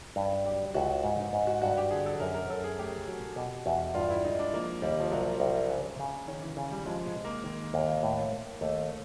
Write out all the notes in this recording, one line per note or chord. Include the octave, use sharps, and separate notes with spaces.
G2
F#3 G4
C#2 F#4
G#2
D#4
G#2
F#4
G2 F#4
G4
D3 G#4
A4
F#2 A#4
A#4
F#2 A4
G#4
A3 G4
F#3 F#4
B2 G4
E2 F#4
G2 F4
E4
G#3 D#4
D4
F3 A#3
D#2 G3
F3
C2 F#3
F3
C2
C#3
C#3
D#3 C#4
E3
C#3
G3
F3 G#3
G#3
C3
A#3
D#3
D#2
A2
A#3
D#2 A3